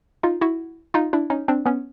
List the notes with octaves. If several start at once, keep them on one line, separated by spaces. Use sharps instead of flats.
D#4 F4
E4 F#4
D#4 F4
D4 E4
C#4 D#4
C4 D4
B3 C#4